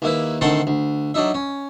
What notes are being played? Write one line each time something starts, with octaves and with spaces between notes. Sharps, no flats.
D#2 A#3 E4 B4
D2 D#3 C4 F#5 A5 C6
D2
F#3 D4 D#4 E5
C#4